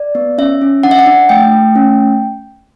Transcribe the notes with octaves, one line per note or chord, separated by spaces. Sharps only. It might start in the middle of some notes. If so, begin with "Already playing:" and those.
Already playing: D5
B3
C#4 E5
C#4
D4 F#5
E5
F#5
D4
A3 G5
A3
C#4